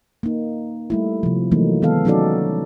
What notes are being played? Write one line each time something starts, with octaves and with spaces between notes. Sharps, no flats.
A#3 D#4
G3 A3 E4
C3 F3
E3 F#3 A3 A#3 D#4
D#3 G#3 B3 A4 F5
F#3 C#4 D#4 F#4 A4 D5